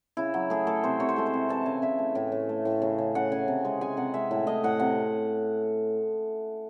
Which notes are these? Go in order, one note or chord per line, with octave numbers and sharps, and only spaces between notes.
C#3 E4
F#3
A3 G#4
A3 A4
C3 C5
C3 C#5
C5
G#3 A4
C5
C3
E3 A5
C#3 G#5
C#3 E5
A3
A2
A2
A3
A2
C#3
C#3
C#3 F#5
C#3 G#5
C3
G#3
G#3 G#5
C3 F#5
G#3 E5
A2
A2 D#5
A2 F#5
C3 F#5